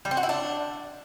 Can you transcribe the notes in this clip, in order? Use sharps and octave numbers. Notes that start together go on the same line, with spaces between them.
G3
C4
F#4
E4
D4